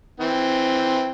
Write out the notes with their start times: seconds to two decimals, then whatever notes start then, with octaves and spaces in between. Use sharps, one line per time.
0.20 E3 C4